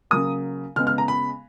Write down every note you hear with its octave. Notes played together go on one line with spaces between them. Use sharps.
C#3 F#3 A#3 D#6
C#3 G#3 B3 F6
F6
A#5
B5